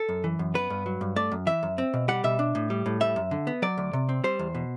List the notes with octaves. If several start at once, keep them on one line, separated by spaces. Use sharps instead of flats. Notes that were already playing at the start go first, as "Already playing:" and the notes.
Already playing: A4
F#2
E3
F#2
B3 B4
G2
F#3
G2
A3 D5
F#2
E3 E5
F#2
C4
B2
G3 F#5
B2 E5
D4
A2
G3
A2
G3 E5
F#2
D3
B3
F#3 D5
D2
C3
C4
G3 C5
E2
B2